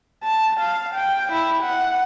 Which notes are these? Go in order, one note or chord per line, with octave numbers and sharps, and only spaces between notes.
A5
F5
G5
E4
F#5